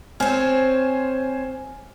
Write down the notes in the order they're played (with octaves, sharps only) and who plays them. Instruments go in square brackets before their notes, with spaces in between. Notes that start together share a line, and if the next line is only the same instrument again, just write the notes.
[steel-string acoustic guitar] C4 C#5 [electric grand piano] C5 G#5 F6